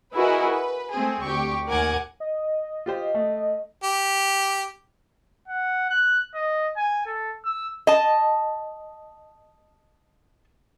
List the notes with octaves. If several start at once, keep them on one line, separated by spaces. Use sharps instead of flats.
E4 F#4 G#4 A#4 B4 D#5
B4
A3 C4 G#4
D2 G4 C#6
D#2 A#4 F#5 G#5 D6 G#6
D#5
F4 G4 C5
A3
G4
F#5
F#6
D#5
G#5
A4
E6
D#5 A5